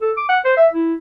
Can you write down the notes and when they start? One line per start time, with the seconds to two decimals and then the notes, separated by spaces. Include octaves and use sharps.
0.01 A4
0.16 D6
0.29 F#5
0.45 C5
0.57 E5
0.72 E4